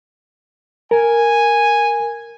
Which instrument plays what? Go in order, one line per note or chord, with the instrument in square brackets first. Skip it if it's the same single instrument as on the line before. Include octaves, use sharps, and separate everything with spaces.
[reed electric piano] A#4 [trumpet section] G#5